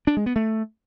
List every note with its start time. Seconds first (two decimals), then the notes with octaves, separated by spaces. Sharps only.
0.07 D4
0.17 G#3
0.26 B3
0.36 A3